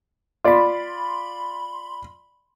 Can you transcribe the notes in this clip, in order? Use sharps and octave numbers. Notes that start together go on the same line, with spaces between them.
F4 D5 B5 C6